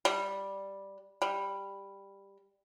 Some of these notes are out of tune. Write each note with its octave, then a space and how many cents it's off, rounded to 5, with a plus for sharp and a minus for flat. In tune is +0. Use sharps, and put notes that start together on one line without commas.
G3 +0
G3 +10